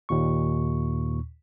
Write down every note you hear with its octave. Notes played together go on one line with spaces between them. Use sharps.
D#2 A#2 C#6